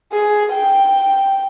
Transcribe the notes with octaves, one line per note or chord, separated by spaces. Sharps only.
G#4
G5